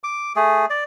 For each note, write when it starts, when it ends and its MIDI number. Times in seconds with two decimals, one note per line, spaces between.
0.04 0.33 86
0.36 0.66 57
0.36 0.66 68
0.70 0.84 74